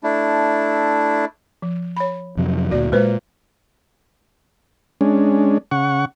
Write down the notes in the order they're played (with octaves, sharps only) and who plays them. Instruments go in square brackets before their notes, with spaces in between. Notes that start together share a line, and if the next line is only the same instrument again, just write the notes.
[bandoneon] A3 D4 E4
[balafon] F3
C#5 B5
[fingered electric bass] F2 C3 F#3
[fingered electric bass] D2 A#2 [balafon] F#4 D5
[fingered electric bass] A#2 [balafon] G#3 B4 C5
[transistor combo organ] G#3 C#4 D4
C#3 F#5 C#6